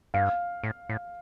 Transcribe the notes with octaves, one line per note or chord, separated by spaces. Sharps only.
G2 F5
A2
A2